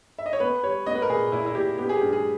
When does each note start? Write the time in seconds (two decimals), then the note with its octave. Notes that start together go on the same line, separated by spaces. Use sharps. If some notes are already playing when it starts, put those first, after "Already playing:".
0.18 E5
0.26 D#5
0.33 C#5
0.40 B3 B4
0.63 G3 C#5
0.86 B3 D#5
0.95 B4
1.02 A#4
1.10 A#2 G#4
1.32 A#2 E4
1.46 E4
1.55 A#2 G4
1.78 B3 G4
1.89 G#4
1.96 G4
2.02 G2
2.13 G#4